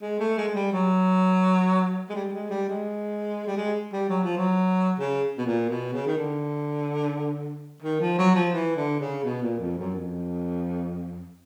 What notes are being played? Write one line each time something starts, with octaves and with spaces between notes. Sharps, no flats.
G#3
A3
G#3
G#3
G3
F#3
G#3
G3
G#3
G3
G#3
G3
G#3
G3
F#3
F3
F#3
C#3
B2
A#2
B2
C#3
D#3
D3
D#3
F3
F#3
F3
E3
D3
C#3
B2
A#2
F2
F#2
F2